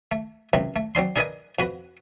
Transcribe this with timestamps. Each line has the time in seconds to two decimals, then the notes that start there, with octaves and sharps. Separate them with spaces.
0.12 A3
0.53 C#2 F#2 C3
0.76 A3
0.95 F#3 C4 D4 C6
1.16 D4 G#4 A#4 B4 D#5 G#5
1.59 F2 F#4 B4 B5